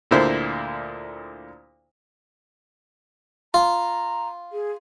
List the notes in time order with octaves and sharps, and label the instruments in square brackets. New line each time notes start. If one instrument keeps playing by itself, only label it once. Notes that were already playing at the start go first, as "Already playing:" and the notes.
[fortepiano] D2 A#2 D3 A#3 E4 C5
[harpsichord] F4 [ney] A#5
[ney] G#4